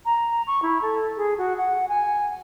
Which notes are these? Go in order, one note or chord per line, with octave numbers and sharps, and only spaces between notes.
A#5
C#6
E4
A4
G#4
F#4
F#5
G#5